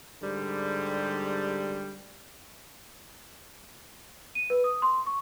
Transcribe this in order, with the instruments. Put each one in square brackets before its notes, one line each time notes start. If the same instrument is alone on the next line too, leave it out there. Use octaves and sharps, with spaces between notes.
[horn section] G#2 D3 G3
[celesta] D#7
B4
D#6
C6
C#6